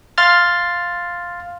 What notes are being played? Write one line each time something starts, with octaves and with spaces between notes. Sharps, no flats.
F5 C6 F6 A6